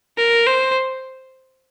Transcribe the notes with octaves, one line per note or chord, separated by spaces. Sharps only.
A#4
C5